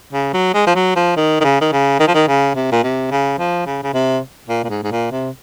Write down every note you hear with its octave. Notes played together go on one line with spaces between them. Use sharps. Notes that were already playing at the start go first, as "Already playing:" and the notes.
C#3
F#3
G#3
F3
F#3
F3
D#3
D#3
C#3
D#3
C#3
D#3
F3
D#3
C#3
C3
A#2
C3
C#3
F3
C#3
C#3
C3
A#2
A#2
G#2
G#2
A#2
C3